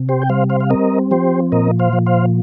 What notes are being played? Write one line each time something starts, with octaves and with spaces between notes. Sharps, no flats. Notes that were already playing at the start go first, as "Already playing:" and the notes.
Already playing: C3
G4 C5
G5
G3 C5 F5
C5 F5
F5
C4 A#4 D#5
F3 G4 C5
A#2 A#4 D#5
C5 F5
F3
C5 F5